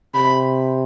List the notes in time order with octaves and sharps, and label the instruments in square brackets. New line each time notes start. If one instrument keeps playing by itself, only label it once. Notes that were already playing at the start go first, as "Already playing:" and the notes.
[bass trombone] C3 [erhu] B5